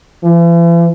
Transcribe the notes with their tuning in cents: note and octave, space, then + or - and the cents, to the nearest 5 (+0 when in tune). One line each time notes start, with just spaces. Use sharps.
E3 +45